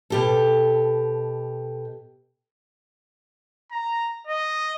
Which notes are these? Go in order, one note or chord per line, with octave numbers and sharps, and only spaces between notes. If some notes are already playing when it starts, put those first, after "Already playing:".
B2 G4 A4
A#5
D#5